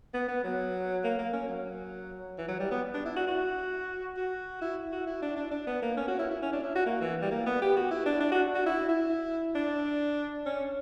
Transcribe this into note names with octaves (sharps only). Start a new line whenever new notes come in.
B3
B3
F#3
A#3
A#3
C#4
F#3
E3
F#3
G3
B3
D4
E4
F#4
F#4
F#4
E4
F#4
E4
D4
D4
D4
B3
A#3
C#4
F#4
E4
E4
C#4
D4
E4
F#4
A#3
E3
G3
A#3
B3
G4
F#4
E4
D4
D4
F#4
F#4
E4
E4
D4
C#4